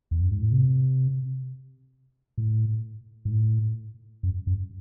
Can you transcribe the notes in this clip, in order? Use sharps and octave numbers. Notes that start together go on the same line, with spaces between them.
E2
F#2
G#2
A2
C3
A2
G#2
A2
F#2
F#2